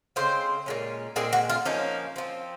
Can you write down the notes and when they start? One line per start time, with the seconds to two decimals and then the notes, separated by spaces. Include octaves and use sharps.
0.16 C#3 G#3 C4 C5
0.66 A#2 G#3 C#4
1.16 A#2 G#3 C4 G#4
1.33 F#4
1.49 F4
1.65 F3 A#3 C#4 D#4
2.16 F3 C4